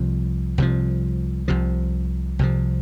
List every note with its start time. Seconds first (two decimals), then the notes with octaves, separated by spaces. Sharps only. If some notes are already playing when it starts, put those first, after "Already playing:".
Already playing: C2 C3 F3
0.58 C2 C3 F3
1.48 C2 C3 F3
2.39 C2 C3 F3